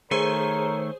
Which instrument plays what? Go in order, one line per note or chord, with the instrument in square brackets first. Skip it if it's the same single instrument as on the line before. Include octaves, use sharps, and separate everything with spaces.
[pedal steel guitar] D#3 A3 [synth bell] G#4 C5 [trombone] A#4 [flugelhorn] C#5